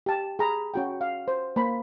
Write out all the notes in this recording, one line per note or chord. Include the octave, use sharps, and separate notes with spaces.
G4 A5
G#4 A#5 B5
C#4 F#4 G5
F5
C5
A#3 C5 B5